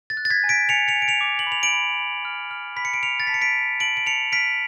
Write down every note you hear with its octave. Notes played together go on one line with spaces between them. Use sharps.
A6
F#6
A6
G#6 B6
G#5
B6 D7
G#5 C#7 F7
C#7 F7
G#5
D7
C#7 F7
D6
F#7
B5
F7
D7 F#7
B5
B5
F6
F6
B5 B6
C#7
D7
F6 C#7 F7
A6
A5 B6
C#7
B6 D7
A5
A5 D7 F#7
D7
A5 C#7 F7
F6 B6 D7